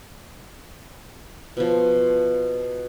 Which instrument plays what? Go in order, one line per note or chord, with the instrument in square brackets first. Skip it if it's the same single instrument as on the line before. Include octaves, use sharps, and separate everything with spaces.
[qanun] B2 F3